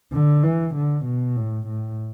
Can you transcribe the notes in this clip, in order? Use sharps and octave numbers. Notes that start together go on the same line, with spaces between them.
D3
E3
D3
B2
A2
A2